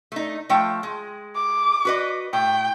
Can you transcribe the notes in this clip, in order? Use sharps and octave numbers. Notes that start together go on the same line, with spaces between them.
A3 D#4
F3 A3 G5
G#3
D6
F#4 B4 D#5
A2 G5